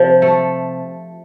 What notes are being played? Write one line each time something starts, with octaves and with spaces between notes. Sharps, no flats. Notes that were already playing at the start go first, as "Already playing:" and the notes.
Already playing: C3 F3
A3